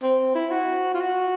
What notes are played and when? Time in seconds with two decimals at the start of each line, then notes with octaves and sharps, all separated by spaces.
0.02 C4
0.35 E4
0.51 F#4
0.94 F4
1.01 F#4